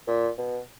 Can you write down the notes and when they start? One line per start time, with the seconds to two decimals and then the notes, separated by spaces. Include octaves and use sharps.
0.08 A#2
0.38 B2